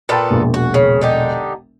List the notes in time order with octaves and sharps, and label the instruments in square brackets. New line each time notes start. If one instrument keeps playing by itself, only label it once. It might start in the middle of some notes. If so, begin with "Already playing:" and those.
[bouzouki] A#2 B3 A4 [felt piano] G5 A5 B5
[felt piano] E1 A#1
[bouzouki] F#4
C#3
D3 D#4 G4